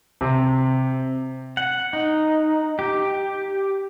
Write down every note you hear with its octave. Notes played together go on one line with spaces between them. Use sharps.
C3
F#5
D#4
G4